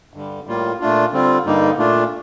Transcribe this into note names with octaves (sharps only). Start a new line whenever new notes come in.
G2 D3 G3
A2 G3 A#3 F4
A#2 A3 D4 F4
D3 G3 C4 F4
G2 D3 G3 A#3 D#4
A#2 A3 D4 F4